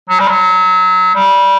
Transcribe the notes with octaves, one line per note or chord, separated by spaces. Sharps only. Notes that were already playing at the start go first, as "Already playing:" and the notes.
F#3
G3
F#3
G3